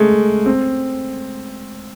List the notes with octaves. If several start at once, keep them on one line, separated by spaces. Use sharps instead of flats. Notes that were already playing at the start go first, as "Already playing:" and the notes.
Already playing: G#3 A3
C4